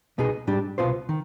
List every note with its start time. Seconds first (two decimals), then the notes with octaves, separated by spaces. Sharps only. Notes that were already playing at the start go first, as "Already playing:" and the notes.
0.18 C2 B2 B3 D#4 G#4
0.47 G#2 G3 D4 G4
0.78 C2 B2 B3 F4 C5
1.09 D#3